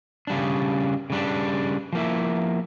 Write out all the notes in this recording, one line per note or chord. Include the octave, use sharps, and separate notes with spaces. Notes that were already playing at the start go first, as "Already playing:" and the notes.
C#3 G3 D4
C#3 G3 D4
F3 A#3 E4